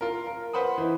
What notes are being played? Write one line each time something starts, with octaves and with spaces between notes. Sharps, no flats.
F4 A#4
A#4
B4 C5 F#5 B5 D#6
E3 D#4